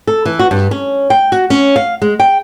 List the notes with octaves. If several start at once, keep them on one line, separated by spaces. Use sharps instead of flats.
A4
E3
F#4
G2
C#4
G5
F#4
C#4
F5
G#3
G5